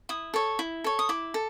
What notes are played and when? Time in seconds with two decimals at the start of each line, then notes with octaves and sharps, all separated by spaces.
0.09 E4 D#6
0.34 A4 C#5
0.59 E4
0.84 A4 C#5
0.99 D#6
1.09 E4 D6
1.34 A4